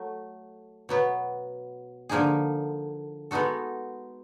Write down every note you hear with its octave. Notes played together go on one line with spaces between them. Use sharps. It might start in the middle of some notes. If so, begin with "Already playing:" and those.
Already playing: F#3 A3
B2 F#3 B3
D3 F3 A#3 D#4 G#4
G#3 B3 D#4 F#4 A4